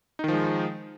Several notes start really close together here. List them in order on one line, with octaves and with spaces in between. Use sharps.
D#4 D#3 F3 G#3